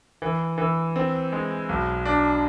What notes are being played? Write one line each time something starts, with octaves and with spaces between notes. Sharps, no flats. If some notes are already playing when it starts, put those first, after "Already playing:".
E3
E3
C4
G#3
B1
D4